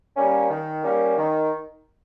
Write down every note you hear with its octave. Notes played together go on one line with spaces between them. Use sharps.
G3 A#3 C#4
D#3
G3 A#3 C#4
D#3